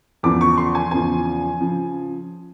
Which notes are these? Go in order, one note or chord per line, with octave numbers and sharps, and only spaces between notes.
E2 C#3 F3 D6
C#6
C6
G#5
E2 C#3 F3 G#5
C#3 F3